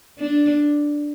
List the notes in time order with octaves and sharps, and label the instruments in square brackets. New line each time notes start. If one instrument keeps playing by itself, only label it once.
[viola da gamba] D4